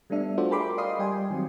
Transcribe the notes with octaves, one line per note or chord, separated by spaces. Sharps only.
G3 A3 B3 D4 E5
F4 F#4 A4 C5 D5 E5
G#4 A#4 G5 B5 C6 D6
D5 D#5 F5 C6 D#6 C7
G3 D5 G5 G#5 C6
D#3 F#3 G3 C4